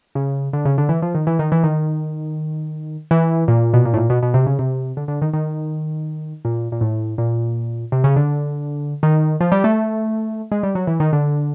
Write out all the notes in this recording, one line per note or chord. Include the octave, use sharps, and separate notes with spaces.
C#3
D3
C#3
D3
E3
F3
D#3
E3
D#3
E3
D#3
E3
A#2
B2
A#2
A2
A#2
B2
B2
C3
C#3
C3
D3
D3
D#3
D#3
A#2
A#2
A2
A#2
C3
C#3
D3
D#3
F3
G3
A3
G#3
G3
F#3
E3
D#3
D3